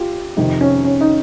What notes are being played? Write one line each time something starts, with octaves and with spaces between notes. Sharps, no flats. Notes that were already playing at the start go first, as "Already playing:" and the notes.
Already playing: F4 G4
F2 C3 D#3 D#4
C#4
C#4
D#4